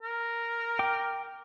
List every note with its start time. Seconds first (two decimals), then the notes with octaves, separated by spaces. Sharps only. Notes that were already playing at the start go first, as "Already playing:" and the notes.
0.03 A#4
0.79 G5 D6